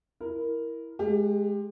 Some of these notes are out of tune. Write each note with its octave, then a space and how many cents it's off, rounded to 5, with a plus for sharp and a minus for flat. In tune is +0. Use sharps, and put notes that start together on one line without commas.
E4 +0 A#4 +0
G#3 +10 G4 +30